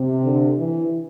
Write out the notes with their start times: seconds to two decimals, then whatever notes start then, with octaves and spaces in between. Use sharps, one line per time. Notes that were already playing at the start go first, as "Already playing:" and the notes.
Already playing: C3
0.24 D3
0.58 E3